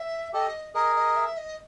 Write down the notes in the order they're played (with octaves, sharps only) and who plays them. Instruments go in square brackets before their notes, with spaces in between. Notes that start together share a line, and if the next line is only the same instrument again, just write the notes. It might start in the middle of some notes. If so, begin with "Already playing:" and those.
Already playing: [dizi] E5
[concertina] G4 A4 [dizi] D#5
[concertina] G#4 A#4 [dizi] D#5
[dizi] D#5
E5
D#5